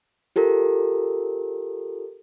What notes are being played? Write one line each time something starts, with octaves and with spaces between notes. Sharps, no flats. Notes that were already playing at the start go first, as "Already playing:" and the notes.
F4 G4 A4 A#4